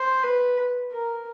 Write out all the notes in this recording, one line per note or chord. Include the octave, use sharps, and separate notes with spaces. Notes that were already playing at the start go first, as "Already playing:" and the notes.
Already playing: C5
B4
A#4